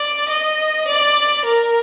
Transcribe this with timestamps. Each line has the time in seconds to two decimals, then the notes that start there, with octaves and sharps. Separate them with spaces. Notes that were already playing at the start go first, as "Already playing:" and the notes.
Already playing: D5
0.28 D#5
0.87 D5
1.45 A#4